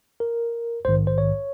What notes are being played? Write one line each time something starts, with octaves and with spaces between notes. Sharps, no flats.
A#4
A#1 G#2 D#3 C5
C5
C#5